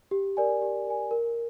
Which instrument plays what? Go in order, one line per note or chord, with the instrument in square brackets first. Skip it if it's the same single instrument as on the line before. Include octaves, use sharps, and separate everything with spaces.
[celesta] G4
A#4 D5 G#5
G4
A#4 D5 G#5
A#4